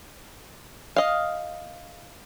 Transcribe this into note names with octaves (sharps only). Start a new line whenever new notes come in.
D#5 F5